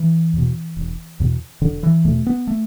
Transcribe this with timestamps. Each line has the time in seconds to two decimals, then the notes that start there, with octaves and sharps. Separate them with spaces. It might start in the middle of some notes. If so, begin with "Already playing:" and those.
Already playing: E3
0.33 E2 B2
0.77 E1
1.20 E2 B2
1.62 E1 D3
1.83 E3
2.05 E2 B2 A3
2.26 B3
2.47 A3